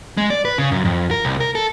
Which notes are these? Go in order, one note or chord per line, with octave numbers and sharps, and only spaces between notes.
G#3
D5
B4
C#3
F#2
F2
A#4
C2
A#4
A4